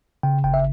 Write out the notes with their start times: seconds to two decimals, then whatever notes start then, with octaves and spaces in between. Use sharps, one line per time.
0.23 C#3 G5
0.44 G1 G5
0.54 E5